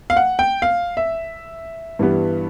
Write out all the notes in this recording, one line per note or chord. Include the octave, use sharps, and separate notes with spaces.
F5
F#5
G5
F5
E5
G2 E3 G3 B3